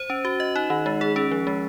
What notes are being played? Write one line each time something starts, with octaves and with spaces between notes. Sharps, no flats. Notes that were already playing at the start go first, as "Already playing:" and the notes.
Already playing: C5
C#4
F#4
D#5
D#4
D#3
G#3
G#4
C#4
F3
G#3